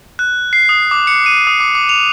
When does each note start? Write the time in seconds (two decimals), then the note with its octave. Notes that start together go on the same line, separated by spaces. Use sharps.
0.19 F#6
0.53 C7
0.69 D#6
0.91 D6
1.07 C#7
1.26 D#7
1.47 D#6
1.60 D6
1.75 D6
1.89 F7